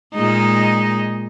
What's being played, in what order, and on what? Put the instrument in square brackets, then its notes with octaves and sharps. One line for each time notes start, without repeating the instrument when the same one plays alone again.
[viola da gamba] A#2 G#3 D#4